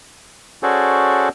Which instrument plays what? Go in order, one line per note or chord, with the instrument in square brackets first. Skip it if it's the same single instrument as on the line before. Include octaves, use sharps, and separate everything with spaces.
[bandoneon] C#4 F#4 G#4 A4 C5 D5